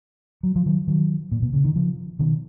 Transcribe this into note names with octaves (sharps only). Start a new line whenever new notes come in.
F#3
F3
D#3 F#3
D#3 F#3
A#2
B2
C#3
D#3
C#3 F3
B2 D#3